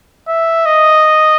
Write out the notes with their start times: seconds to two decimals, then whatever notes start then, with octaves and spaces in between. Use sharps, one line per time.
0.28 E5
0.66 D#5